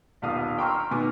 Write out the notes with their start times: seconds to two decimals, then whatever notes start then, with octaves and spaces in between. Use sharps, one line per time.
0.22 D#1 B1 F5 D#6
0.58 G5 A#5 C6 C#6 E6 F6
0.91 B2 D#3 G#5 D6